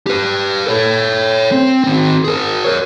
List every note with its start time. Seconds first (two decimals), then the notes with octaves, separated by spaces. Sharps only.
0.07 G4 B4
0.66 A4 C#5
1.52 C4
1.84 D#3 C4
2.24 G#4 A#4
2.64 A#4 C#5